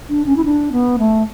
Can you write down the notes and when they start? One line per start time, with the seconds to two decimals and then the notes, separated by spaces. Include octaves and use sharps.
0.09 D4
0.26 C#4
0.37 E4
0.45 D4
0.72 B3
0.99 A3